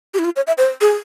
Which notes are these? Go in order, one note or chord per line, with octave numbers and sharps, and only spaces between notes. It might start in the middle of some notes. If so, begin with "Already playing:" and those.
G4
E4
F4
C#5
E5
C5
G#4